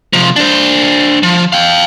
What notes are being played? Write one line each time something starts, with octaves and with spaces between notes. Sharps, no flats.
C3 F3
D4 C5
F3
F5 G5